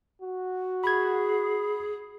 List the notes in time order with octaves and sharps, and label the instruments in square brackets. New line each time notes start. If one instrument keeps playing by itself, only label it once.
[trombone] F#4
[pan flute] G#4 [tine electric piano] B5 G#6